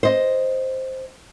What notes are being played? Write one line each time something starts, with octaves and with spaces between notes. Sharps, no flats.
C5 D#5